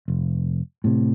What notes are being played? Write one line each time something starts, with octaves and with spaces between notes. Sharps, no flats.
F1
A2 C3